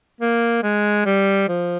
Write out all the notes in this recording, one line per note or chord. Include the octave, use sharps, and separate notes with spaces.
A#3
G#3
G3
F3